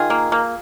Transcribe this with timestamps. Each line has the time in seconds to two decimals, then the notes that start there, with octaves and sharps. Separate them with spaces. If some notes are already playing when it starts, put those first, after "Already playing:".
Already playing: D#3 F4 G#4
0.10 A#3
0.32 A#3